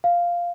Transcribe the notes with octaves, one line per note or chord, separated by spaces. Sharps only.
F5